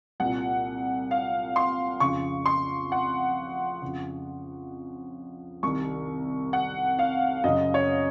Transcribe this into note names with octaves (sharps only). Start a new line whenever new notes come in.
C2 A#2 F#5
F5
C6
F2 C#3 C#6
C6
F#5
F2 C#3
C2 C3 D#3 C#6
F#5
F5
F#2 C#3 D#5
C#5